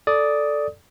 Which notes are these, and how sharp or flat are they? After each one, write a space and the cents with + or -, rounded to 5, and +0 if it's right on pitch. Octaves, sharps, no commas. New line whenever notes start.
A4 +0 D5 +0 D#6 +10